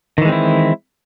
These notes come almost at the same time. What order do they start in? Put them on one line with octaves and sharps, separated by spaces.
D#3 E3 G#3 C4 E4